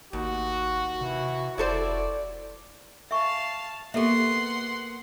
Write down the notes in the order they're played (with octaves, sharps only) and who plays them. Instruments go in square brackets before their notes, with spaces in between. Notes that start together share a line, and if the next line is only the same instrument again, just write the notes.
[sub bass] G#1 [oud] D#2 [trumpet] F#4
[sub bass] C3 [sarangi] E3
[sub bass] F1 [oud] E4 A4 C5 [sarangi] D5
[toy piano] E5 G#5 C#6 [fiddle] F5 A5
[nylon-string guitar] A#3 B3 [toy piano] G4 A4 E5 [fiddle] F#5 C6